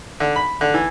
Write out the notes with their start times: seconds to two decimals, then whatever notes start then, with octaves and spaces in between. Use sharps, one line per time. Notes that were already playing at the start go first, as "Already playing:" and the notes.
0.20 D3
0.36 B5
0.61 D3
0.74 E3